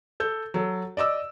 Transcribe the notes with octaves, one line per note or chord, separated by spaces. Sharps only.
A4 G6
F#3 A4
D5 D#5 D6 E6